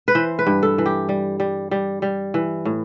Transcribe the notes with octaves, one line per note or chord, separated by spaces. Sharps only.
B4
E3 C5
B4
G2
A4
E3
G4
G3
G3
G3
G3
E3
A2